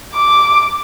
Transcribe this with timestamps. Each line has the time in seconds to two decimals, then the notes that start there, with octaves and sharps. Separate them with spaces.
0.13 D6